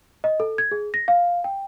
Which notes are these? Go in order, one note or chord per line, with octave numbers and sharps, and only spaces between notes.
D#5
A4
G#6
G#4
A#6
F5
G5